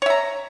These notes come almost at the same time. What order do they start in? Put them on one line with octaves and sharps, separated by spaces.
C#5 E5 A#5